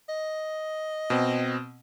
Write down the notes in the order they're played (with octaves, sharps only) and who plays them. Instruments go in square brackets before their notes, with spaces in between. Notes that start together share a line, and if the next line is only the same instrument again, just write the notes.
[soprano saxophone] D#5
[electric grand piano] B2 C4